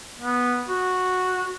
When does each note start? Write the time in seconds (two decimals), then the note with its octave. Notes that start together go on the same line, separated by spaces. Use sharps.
0.18 B3
0.68 F#4